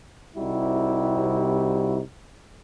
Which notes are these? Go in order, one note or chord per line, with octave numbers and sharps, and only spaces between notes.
C2 C3 G3 D#4 E4 F#4